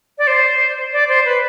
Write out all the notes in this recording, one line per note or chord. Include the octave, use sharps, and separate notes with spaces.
D5
C5
D5
C5
B4